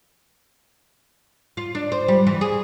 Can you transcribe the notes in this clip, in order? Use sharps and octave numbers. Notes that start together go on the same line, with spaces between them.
F4
D4
C5
G3
E3
G#4